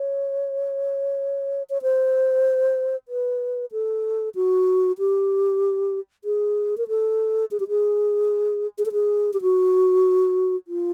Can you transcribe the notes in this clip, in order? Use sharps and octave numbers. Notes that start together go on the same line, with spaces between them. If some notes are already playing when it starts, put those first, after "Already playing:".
Already playing: C#5
C#5
C5
B4
A4
F#4
G4
G#4
A#4
A4
G#4
G4
G#4
G#4
A4
G#4
G4
F#4
F4